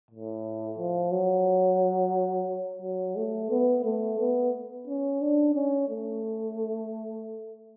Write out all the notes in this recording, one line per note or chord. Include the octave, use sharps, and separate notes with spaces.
A2
F3
F#3
F#3
A3
B3
A3
B3
C#4
D4
C#4
A3